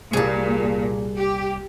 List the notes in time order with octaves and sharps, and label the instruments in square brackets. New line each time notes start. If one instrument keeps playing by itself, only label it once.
[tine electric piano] C2 G3 [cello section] A#2 [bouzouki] G#4 A5
[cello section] G4